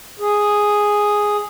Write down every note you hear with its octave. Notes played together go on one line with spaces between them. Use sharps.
G#4